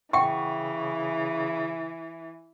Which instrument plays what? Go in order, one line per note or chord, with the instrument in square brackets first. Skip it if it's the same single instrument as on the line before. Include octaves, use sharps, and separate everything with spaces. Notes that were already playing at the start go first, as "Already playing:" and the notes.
[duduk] C#3 [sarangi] E3 [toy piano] E5 F#5 G5 [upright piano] C#6